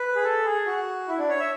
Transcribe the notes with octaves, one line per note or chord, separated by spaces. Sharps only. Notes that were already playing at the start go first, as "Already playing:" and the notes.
Already playing: B4
G#4
A4
G#4
F#4
E4
D4
C#5
E5